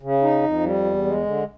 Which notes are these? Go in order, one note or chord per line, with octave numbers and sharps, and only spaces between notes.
C#3
D#4
F2
G3
E2
G#3
D3